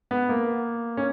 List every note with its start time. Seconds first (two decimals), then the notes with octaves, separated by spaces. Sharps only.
0.11 B3
0.29 A#3
0.97 C#4